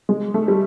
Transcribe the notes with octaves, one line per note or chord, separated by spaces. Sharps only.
G#3
A3
G3